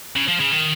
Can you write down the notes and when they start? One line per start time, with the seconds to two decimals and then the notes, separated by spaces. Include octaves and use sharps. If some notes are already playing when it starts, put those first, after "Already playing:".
0.16 C#3
0.28 F3
0.41 C#3
0.52 D#3